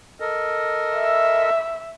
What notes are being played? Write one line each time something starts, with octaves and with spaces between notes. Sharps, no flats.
A4 A#4 D#5
E5